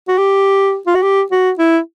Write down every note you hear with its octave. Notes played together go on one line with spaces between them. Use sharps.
F#4
G4
F4
F#4
G4
F#4
E4